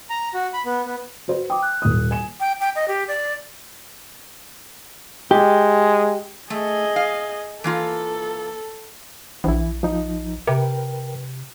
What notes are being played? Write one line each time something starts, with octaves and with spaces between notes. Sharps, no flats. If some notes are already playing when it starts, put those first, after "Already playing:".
A#5
F#4
B5
B3
B3
F#4 B4 C5
G5 D6 D#6
F#6
D#1 D#6
G#5 E7
G5
G5
D#5
G4
D5
G#3 G4
A3 G#4 D#5
F5
E3 A#3 F4 A4
A#1 E3 E4
F3 D#4
C3 A#4 B4 G5